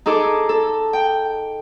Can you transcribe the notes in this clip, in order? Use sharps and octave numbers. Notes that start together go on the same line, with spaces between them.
D#4 G#4 A4 D6
A4
G5